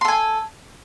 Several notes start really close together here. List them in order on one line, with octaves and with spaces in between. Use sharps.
C6 A4 G#5